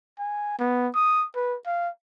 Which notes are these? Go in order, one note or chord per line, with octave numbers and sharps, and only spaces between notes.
G#5
B3
D#6
B4
F5